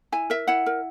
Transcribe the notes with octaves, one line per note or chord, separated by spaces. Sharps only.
E4 G#5
A#4 E5
E4 F#5
A#4